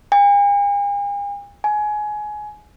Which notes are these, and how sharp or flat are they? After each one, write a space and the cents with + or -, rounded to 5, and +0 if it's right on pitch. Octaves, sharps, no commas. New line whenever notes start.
G#5 -45
G#5 +20